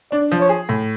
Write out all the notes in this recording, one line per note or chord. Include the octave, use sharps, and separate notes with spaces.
D4 D5
F3
C#5
G#4
A2